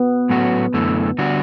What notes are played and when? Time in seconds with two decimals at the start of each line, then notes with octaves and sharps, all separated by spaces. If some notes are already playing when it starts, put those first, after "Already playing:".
Already playing: B3
0.29 A2 F#3 A3 C#4 F#4
0.74 F#2 D3 A3 E4 A4
1.18 D3 G3 D4 F#4